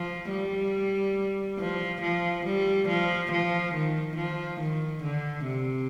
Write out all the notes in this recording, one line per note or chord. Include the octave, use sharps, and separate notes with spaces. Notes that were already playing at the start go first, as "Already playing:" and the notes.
Already playing: F3
G3
F3
F3
G3
F3
F3
D#3
F3
D#3
D3
C3